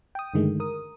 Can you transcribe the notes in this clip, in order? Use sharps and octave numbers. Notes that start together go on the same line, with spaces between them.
G5 D#6
G2 D3 D#3 G#3 A3
A#4 D#6